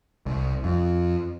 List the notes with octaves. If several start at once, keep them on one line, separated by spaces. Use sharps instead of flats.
C2
F2